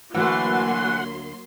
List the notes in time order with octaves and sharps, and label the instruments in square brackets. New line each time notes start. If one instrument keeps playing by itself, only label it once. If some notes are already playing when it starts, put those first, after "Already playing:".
[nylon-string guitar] D2 F#4 [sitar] E3 A3 [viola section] F#3 A#3 C6 [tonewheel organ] F#5